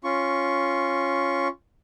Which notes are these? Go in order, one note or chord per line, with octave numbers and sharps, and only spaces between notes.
C#4 F4 C#6